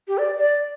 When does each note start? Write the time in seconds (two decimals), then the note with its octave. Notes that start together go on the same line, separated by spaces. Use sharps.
0.08 G4
0.18 D5
0.38 D5